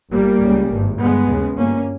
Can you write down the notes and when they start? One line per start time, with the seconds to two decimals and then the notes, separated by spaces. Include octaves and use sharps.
0.11 G1 G2 G3 A#3
0.41 C#2 C#3
0.70 G#1 G2
0.99 G1 G2 G#3 B3
1.28 D#2 C#3
1.57 G1 G2 A#3 C#4